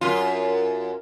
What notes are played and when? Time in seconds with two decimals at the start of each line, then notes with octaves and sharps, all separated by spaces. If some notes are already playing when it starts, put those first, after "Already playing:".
0.01 F#2 F4